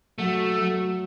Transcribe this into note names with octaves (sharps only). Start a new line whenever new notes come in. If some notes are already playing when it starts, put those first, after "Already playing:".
F#3 A3
F#3